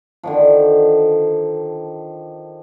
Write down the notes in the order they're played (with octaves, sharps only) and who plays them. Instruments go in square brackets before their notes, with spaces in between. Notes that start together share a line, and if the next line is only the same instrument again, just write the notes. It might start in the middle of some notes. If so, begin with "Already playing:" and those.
[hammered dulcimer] D3 D#3 F3